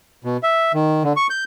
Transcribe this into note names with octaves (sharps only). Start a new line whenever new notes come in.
B2
E5
D#3
D3
C#6
G6